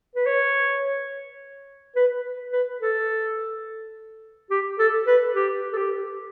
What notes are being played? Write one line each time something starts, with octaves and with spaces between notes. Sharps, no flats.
B4
C#5
B4
B4
A4
G4
A4
B4
G4
A4
G4